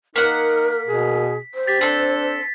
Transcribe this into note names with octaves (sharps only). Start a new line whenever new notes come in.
A#3 D#4 A#4 F#5 B6
B2 G#4
C5
G4 A6 B6
C4 D4 A4